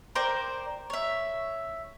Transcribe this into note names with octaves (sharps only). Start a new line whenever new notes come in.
A#4 C5 D5 G5
C#5 E5